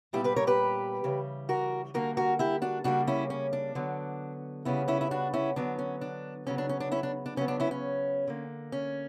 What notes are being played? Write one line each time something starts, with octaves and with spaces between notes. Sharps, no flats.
A#2 G3 B3 E4 G4
G4 B4
A#4 C#5
G4 B4
C#3 E3 G3
F#4 A#4
D3 G3 A#3 F#4 A#4
F#4 A#4
E4 G4
D4 F#4
C#3 G3 A#3 D4 F#4
C#4 E4
C#4
D4
D3 F#3 B3
C#3 G3 B3 C#4 E4
C#4 E4
E4
D4 F#4
C#4 E4
D3 F#3 B3 D4
C#4
D4
C#3 F#3 B3 C#4
D4
C#4
D4
C#4 E4
D4
D4
C#3 F#3 B3 C#4
D4
C#4 E4
C#4
D3 A#3
C#4